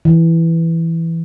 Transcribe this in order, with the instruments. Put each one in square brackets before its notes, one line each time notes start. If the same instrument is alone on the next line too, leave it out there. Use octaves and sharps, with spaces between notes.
[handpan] E3